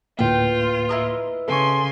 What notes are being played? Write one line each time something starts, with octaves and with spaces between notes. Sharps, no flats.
D2 A2 A#3 F4 B4 G5
E4 A#4 D#5
C#3 A4 G#5 C6 C#6